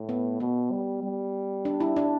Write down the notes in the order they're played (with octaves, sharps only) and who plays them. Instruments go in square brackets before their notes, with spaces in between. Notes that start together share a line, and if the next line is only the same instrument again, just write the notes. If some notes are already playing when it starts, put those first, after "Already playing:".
Already playing: [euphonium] A2
[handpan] B3
[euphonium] B2 [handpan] B3
[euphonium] G3
G3
[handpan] D4
E4
D4